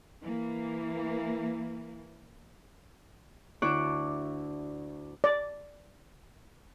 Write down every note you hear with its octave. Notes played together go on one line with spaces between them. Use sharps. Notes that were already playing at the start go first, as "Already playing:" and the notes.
E3 A#3
D2 D4 E4 C#6 D6 F#6
D5